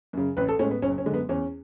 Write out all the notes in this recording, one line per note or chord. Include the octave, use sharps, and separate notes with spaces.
F#2 C#3
A1 B4
A4
A2 G#3 C#4
B3
F#1 C#4
C#4
F#2 D3 G#3
B3
E2 C#4